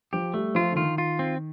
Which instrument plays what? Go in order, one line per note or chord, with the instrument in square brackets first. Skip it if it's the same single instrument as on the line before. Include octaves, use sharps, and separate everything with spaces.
[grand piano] F3 [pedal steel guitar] G4
[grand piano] G3 [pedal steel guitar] A3
[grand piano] F3 [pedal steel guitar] F4
[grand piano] D3
[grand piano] D#3 [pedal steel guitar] F4
[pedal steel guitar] F4
C4